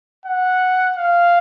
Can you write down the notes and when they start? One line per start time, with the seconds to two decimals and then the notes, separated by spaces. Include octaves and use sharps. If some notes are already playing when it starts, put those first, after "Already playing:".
0.25 F#5
0.96 F5